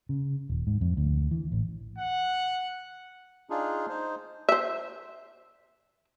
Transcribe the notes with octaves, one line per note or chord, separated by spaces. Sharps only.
C#3
D#1
G#2
F2
D2
E3
A1
F#5
D4 D#4 F4 G#4
D#4 C5
C5 E5